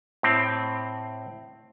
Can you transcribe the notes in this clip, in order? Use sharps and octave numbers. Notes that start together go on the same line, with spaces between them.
A2 C4